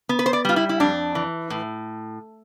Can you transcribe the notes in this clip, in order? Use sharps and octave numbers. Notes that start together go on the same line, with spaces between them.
B3
B4
C5
D5
G3 F4
E4
E4
F2 D4
E3
A2